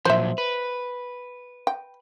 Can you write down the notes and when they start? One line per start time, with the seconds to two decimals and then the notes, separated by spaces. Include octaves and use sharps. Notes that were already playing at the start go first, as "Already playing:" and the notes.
0.05 A#2 F3 F#3 C5 E5
0.38 B4
1.67 G5